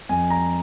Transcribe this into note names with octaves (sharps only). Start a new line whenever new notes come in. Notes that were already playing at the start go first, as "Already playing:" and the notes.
F2 G#5
A#5